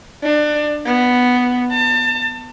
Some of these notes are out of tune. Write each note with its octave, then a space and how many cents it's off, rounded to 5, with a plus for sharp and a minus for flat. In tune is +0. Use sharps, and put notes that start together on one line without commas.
D4 +25
B3 +0
A5 +30